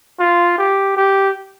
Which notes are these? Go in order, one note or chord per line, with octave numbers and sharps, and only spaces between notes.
F4
G4
G4